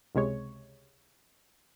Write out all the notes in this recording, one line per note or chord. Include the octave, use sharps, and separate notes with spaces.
C#2 C3 G#3 C#5